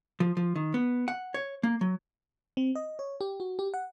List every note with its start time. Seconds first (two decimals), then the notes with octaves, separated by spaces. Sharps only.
0.20 F3
0.37 F3
0.56 D#3
0.74 B3
1.08 F#5
1.34 C#5
1.63 A#3
1.81 F#3
2.57 C4
2.75 D#5
2.99 C#5
3.21 G4
3.40 F#4
3.59 G4
3.74 F#5